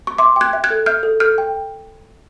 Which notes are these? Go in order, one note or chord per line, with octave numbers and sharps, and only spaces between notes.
C#6
E5 C6 D6
G5 F#6 G#6
E5
F#6 G#6
A4
E5 F6 G6
A4
A4 F6 G6
G5